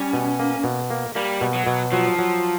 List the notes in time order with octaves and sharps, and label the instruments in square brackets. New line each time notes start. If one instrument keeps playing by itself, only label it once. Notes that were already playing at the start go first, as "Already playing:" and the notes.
Already playing: [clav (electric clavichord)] G3 [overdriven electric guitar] C#4
[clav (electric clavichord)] B2
A#3
B2
A#3
[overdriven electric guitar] G3 [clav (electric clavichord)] A#3
[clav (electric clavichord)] B2
[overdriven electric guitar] F#3
[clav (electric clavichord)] B2
[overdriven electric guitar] F3 [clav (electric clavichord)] F#3
[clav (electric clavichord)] F#3